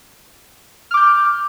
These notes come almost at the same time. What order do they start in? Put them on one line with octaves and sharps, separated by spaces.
F6 D6 G6